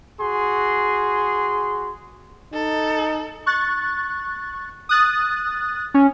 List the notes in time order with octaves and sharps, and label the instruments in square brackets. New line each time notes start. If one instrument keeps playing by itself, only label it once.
[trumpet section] F#4 G#4 C6
[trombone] D#4 [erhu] A4
[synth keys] C#6 F#6 A6
D#6 F#6 A6
[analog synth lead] C#4